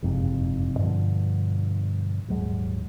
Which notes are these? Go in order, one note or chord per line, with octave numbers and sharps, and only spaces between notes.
F#1 F2 G#2 C3
G2 B2 D3 F3
D#1 G#2 F#3 G#3